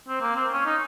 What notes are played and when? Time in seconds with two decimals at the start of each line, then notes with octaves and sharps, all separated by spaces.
0.08 C4
0.21 A#3
0.36 C4
0.52 C#4
0.66 D#4